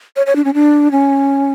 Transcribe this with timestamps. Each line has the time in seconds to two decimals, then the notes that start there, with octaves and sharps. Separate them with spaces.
0.16 C#5
0.26 C#5
0.36 D4
0.45 C#4
0.54 D4
0.92 C#4